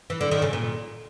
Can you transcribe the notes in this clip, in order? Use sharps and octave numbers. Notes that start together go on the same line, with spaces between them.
E3
D3
D#3
C#3
A#2